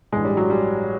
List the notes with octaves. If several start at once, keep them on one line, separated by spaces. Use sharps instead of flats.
A1 G2 E3 G#3
G3
F#3
G3